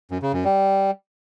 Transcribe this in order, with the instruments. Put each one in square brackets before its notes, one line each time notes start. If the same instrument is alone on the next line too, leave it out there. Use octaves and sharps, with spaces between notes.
[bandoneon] F#2
C#3
F#2
G3